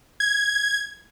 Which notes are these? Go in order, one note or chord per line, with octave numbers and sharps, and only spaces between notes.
G#6